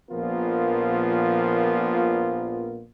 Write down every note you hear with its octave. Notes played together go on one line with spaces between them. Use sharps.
A#1 A#2 F3 B3 F4 A#4